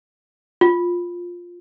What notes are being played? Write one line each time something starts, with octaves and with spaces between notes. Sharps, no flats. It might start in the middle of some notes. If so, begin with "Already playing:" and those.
F4